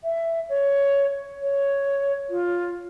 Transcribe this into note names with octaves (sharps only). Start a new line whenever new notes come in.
E5
C#5
C#5
F4